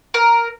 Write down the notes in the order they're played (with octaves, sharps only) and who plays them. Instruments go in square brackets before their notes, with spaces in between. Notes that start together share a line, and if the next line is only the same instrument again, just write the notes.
[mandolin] A#4